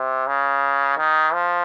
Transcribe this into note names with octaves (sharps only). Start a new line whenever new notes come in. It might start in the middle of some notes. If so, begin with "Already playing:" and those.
Already playing: C3
C#3
D#3
F3